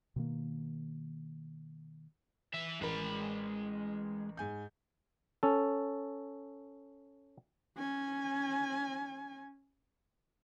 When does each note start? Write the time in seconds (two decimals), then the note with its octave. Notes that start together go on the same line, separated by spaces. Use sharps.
0.16 B2 D#3 A#3
2.54 E3 E5
2.81 A1 G#3 A#4 B5
4.37 G#2 G#5 G6
5.43 C#4 A4
7.77 C#4 G#5